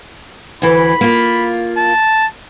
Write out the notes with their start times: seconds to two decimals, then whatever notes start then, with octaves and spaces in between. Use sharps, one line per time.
0.62 D2 E3 B5
1.01 A#3 F4
1.77 A5